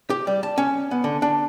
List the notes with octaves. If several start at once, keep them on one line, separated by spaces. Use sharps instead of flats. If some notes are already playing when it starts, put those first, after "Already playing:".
G4
G3
A5
C#4
B3
D3
D4